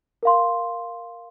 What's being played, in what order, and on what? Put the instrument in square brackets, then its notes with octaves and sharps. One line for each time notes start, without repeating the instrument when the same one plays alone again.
[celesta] A#4 F5 C6